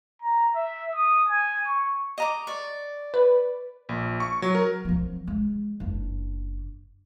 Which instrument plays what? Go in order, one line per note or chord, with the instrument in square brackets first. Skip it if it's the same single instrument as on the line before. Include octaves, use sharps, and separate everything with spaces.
[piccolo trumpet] A#5
E5
D#6
G#5
C#6
[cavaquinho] D#5 A#5 D6
D5 C#6
[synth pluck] B4
[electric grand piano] A#1
C#6
F#3
A#4
[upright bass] F3 C4
G#3
F#1 D4